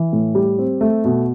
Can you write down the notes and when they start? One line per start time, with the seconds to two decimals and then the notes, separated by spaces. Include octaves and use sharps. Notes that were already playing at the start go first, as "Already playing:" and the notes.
Already playing: E3
0.13 A2
0.35 G3
0.59 C4
0.81 A3
1.05 B2